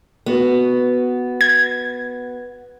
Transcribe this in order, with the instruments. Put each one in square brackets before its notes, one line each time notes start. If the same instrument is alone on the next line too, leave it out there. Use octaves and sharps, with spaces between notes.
[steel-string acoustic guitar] B3 F#4
[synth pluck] G#6